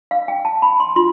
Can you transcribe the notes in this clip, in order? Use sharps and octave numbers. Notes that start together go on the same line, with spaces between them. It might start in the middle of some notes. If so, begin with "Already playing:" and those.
F5
G5
A5
B5
C6
F4 C6